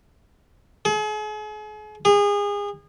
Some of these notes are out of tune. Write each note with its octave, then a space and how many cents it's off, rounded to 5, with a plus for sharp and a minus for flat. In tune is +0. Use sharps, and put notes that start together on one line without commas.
G#4 +40
G#4 -30